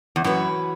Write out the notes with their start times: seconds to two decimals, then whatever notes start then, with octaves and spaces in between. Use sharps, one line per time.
0.16 E2
0.24 F#2 E3 A3 C#4 F#4 B4